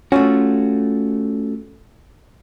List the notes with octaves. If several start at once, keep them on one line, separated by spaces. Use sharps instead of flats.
A3 C#4 F4 F#4